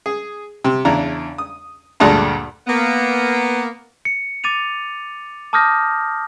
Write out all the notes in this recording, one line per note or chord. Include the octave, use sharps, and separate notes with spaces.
G#4
C3
E2 C#3 D4 E4 A#5
D#6
D2 G2 A#2 G#3 A3 D4
A#3 B3
C#7
D6 A6 D#7 F7
A5 D6 D#6 F6 G6 A#6